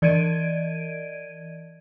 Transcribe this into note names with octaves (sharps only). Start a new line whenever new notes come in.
E3 D5 D#5 G#6 D7 D#7